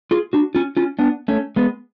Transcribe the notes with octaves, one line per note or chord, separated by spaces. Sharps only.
F4 G#4
D4 F#4
C#4 F4
C#4 F4
B3 D4
A3 C#4
G#3 B3